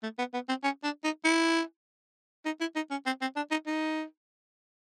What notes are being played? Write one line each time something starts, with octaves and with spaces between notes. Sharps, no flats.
A3
B3
B3
C4
C#4
D4
D#4
E4
D#4
E4
D#4
C#4
C4
C4
D4
D#4
D#4